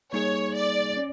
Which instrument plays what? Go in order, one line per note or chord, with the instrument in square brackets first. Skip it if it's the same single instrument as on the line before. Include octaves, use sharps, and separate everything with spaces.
[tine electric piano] G3 A#3 D#4 G#4 [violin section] C#5
[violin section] D5
[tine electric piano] C#4